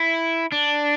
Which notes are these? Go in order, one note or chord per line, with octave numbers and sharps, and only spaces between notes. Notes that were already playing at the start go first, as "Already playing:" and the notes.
Already playing: E4
D4